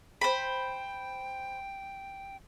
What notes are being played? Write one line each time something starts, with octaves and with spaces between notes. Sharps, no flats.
C5 G5 B5